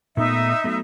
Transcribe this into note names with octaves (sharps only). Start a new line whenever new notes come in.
A#2 A3 B3 D#4 E5
F#3 A3 B3